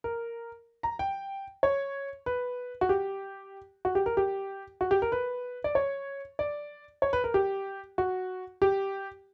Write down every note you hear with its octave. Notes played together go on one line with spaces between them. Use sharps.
A#4
A#5
G5
C#5
B4
F#4
G4
F#4
G4
A#4
G4
F#4
G4
A#4
B4
D5
C#5
D5
C#5
B4
A#4
G4
F#4
G4